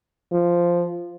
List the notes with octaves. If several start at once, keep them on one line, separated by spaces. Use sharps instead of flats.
F3